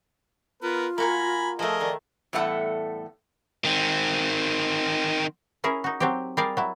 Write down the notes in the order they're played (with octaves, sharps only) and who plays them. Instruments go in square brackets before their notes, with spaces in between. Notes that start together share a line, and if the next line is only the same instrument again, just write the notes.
[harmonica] B3 A#4 B4 [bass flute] F4
[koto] A#3 F#4 A#4 [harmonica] G#5 A#5 B5
[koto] F3 A3 [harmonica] G#4 A#4 D#5
[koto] D#3 [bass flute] D5
[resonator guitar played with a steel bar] E2 A2 G3 A3 A4 F#5
[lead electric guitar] D#3 C4
[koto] C#4 E4 G#4 A#4
D#4 F#4
F#3 C4 G4
G3 G#4 A#4 D5 F5
F#3 E4